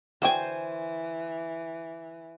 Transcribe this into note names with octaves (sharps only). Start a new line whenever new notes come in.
D3 E3 F#4 C5 G5 G#5